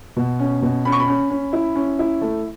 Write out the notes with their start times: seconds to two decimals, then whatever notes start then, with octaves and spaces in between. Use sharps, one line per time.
0.17 B2
0.40 C#4
0.62 B2
0.85 C#4 B5
0.92 C#6
1.00 B5
1.08 C#4
1.30 C#4
1.53 E4
1.76 C#4
1.99 E4
2.21 A3